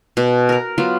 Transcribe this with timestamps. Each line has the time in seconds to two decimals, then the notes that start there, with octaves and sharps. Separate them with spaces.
0.17 B2
0.49 A#4 A#5
0.78 F#3 B3 F4